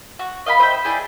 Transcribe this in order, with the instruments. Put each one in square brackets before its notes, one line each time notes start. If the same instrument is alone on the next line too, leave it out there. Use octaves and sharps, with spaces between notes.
[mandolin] F#4
D#5 F5 G5 B5
C5 D#5 E5 G5
D4 E4 G#4 G5